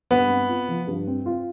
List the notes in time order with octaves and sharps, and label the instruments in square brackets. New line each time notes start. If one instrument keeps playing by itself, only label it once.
[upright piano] G2 [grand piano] B3
[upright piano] C4
F4
F3
G2
C4
F4